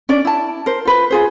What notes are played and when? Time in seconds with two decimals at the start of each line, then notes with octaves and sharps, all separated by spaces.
0.09 C#4 D4 D5
0.25 E4 A5
0.66 A#4 C5
0.85 F4 B4 C5
1.10 F4 G#4 C5